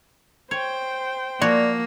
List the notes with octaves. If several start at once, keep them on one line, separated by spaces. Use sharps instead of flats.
C5 C#5 G5
F3 A#3 F#4 C#5 D5